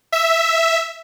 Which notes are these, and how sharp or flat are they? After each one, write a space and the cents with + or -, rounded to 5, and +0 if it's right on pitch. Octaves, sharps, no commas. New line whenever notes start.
E5 +0